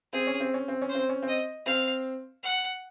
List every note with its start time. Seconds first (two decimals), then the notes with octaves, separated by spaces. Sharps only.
0.13 C4 G#4
0.27 C#4
0.40 C4
0.54 C#4
0.68 C4
0.82 C#4
0.89 C5
0.94 C4
1.09 C#4
1.22 C4
1.28 D#5
1.66 C4 F5
2.43 F#5